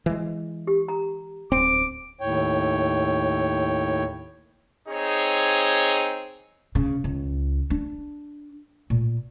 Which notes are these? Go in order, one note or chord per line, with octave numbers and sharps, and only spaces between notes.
E3 G#3
G4
A#5
D1 C4 D6
D#2 A2 C#5 G5
C4 D#4 G#4 C#5
C#3
C#2
D4
A#2